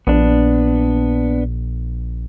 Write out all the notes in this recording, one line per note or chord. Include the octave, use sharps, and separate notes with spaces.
A#1 B3 D4